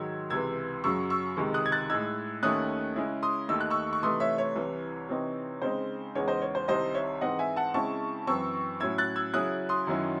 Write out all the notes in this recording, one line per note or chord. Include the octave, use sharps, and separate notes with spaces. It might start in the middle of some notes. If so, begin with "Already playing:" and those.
Already playing: G#2 D#3 F#3 E6 G#6
C#2 C3 E3 E6 G#6
F#2 C#3 F#3 C#6 E6
C#6 E6
C#2 C3 D#3 G#3
D#6 F#6
G#6
F#6 A6
A2 G#3 D#4 E6 G#6
D#2 D#3 A3 C#4 D#6 F#6
C#3 G#3 C#4 E4
C6 D#6
D#2 D#3 A3 D#4 E6
F#6
C#6 E6
C#6
C3 E3 A3 D#4 C6 D#6
C#5 E5
C#5
C2 C3 E3
C3 E3 C4 D#4
C#3 G#3 C4 D#4 C5
E2 C#3 G#3 D#4 C#5
C5 D#5
C#5
C5
C2 C3 D#3 C5 D#5
C#5 E5
G#2 E3 C4 D#4 D#5 F#5
E5 G#5
F#5 A5
C#3 G#3 C4 E4 A5 C#6
F#2 E3 C4 C#6 E6
A2 F#3 C#4 E4 E6 G#6
F#6 A6
E6 G#6
C#3 F#3 C#4 E4 D#6 F#6
C6 D#6
F#2 D#3 F#3 C#4 E4